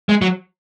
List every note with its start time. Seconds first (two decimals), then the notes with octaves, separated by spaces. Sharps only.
0.09 G#3
0.22 F#3